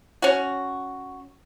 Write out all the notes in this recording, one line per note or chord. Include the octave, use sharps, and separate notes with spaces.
C#4 F#4